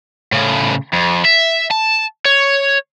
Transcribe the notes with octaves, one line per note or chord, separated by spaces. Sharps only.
A2 C#3
F2
E5
A5
C#5